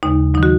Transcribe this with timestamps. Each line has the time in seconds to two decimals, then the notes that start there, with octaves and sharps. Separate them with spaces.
0.03 D#2 C#3 G#3 D#4
0.34 D#3 F#3 D#4
0.43 F#4